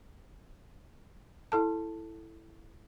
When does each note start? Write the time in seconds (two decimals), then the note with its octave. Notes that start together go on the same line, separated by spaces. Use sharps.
1.52 E4 A4 A5